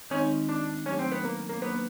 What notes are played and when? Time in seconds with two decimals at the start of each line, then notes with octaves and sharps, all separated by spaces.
0.10 D#3 G#3 C4 C#4 D#4
0.49 D4
0.86 F#3 A3 C#4 D4 G4
0.99 C4
1.12 B3
1.24 A#3
1.49 A#3
1.61 F#3 A#3 B3 D4